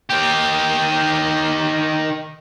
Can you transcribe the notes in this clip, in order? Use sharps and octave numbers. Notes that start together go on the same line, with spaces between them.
D#3 G4